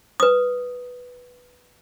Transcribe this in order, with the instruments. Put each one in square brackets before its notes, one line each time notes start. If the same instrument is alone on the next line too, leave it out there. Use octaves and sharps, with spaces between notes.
[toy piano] B4 D#6